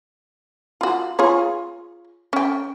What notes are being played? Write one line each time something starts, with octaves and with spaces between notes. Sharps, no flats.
F4 F#4
F4 G#4 C#5
C#4 G5